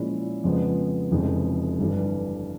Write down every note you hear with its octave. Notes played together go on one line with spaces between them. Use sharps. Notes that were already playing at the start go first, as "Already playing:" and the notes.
Already playing: A#2 F3 G#3 C#4 E4
F2 C#3 F3 G#3 B3
F1 F2 C#3 E3 G#3
G1 G2 E3